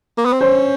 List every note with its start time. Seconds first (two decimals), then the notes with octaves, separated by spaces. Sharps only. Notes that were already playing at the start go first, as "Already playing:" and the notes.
0.18 A#3
0.25 B3
0.33 C4
0.40 C#4 C5